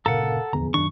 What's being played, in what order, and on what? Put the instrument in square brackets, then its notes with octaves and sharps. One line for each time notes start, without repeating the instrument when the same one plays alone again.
[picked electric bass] G1 A#2 C#3 [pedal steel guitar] A4 F#5 [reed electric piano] A#4 F5 [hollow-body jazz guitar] A#5
[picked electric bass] D1 E2 D3 [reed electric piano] F3 B3 G#4 [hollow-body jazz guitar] A#5
[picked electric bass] F#2 D#3 [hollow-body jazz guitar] D4 [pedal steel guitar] C#6